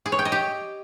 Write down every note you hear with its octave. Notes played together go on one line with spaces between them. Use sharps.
G#4
C#5
G5
D#5
G4